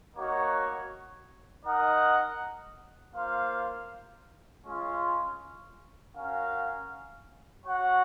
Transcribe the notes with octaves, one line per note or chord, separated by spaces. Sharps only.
A#3 D#4 F#4 C#5
D#4 A#4 D#5 F#5
A#3 F4 C5 F5
G#3 C#4 F4
C#4 F#4 A#4 F5
F#4 C#5 F#5